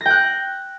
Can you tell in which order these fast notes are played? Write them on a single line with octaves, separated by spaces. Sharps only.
A#6 G5 F#6